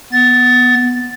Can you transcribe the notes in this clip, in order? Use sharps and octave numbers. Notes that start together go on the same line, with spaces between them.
B3 A6